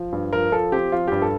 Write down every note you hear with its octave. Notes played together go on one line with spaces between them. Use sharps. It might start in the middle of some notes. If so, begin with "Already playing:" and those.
Already playing: F3
G2
F3 A#4
F3 A4
C4 G4
F3 F4
G2 G4
A4